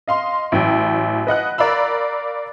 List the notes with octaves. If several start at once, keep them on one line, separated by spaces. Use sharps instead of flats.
D#5 F5 C6
A1 F#3 G5
B4 D#5 F#5 F#6
A#4 D5 F5 A#5 B5 E6